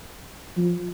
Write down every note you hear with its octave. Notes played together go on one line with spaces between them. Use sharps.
F3